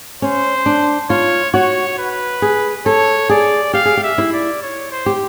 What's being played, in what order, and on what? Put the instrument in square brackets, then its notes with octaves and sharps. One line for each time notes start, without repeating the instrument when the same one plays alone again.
[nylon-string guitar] C#4 [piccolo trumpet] C5
[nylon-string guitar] D4
[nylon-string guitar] F4 [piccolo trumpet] C#5
[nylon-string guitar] F#4 [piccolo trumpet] C#5
[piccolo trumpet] B4
[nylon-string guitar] G#4
[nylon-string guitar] A4 [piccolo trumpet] C#5
[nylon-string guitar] G#4 [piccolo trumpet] D5
[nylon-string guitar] G4 [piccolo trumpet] F5
[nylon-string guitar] G#4
G4
[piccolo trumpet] E5
[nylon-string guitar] E4
[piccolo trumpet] D5
C#5
C5
[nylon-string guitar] G4